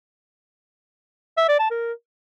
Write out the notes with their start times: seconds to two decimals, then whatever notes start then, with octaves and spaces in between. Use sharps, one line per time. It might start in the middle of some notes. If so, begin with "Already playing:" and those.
1.37 E5
1.48 D5
1.59 A5
1.70 A#4